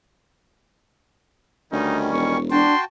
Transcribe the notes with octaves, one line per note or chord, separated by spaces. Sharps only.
D2 D#3 G3 C#4 D#4
E1 C#6
D4 F#4 G5 A5 C6